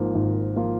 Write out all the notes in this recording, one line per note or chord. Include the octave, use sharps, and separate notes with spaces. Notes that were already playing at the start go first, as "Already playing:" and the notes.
Already playing: G#1 G#2 F3 A#3 F4
G#1
F3 A#3 F4